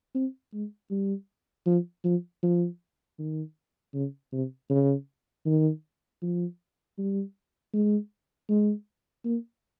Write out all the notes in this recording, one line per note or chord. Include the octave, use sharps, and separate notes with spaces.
C4
G#3
G3
F3
F3
F3
D#3
C#3
C3
C#3
D#3
F3
G3
G#3
G#3
A#3